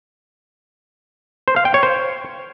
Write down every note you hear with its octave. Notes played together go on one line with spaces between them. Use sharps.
C5
F5
G5
C#5
C5